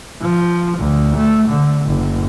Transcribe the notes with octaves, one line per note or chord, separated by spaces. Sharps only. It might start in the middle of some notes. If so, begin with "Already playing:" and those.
F3
D2
A3
D3
F#1